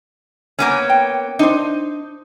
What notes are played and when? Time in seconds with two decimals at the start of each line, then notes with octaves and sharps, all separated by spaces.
0.59 A#3 B3 C#4
0.90 G5
1.39 D4 D#4 C5